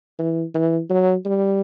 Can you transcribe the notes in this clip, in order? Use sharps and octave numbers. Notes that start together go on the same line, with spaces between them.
E3
E3
F#3
G3